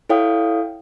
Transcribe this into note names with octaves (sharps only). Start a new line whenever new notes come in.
E4 A4 C#5 F5 G5 D#6